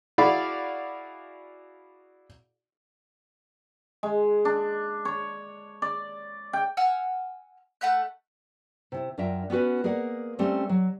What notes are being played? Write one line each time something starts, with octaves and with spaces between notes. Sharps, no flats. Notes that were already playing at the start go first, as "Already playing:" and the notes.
E4 F#4 G#4 D5 F5 B5
G#3
D4
C#5
D5
G5
F#5 G#5 E6 F6
A3 F#5 B5 F#6
C3 E4
F#2 D4 F4 A#4 E5 G5
B3 C#4 F#4 B4
A#3 G#4 A#4 D5 F#5
G3 A3 C4 C#4
F#3